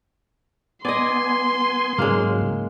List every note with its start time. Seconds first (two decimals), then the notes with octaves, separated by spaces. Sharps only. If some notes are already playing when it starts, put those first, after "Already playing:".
0.85 B3 D5 D#5 G#5 C6
1.98 G#2 C#3 F#3 G#3 A#3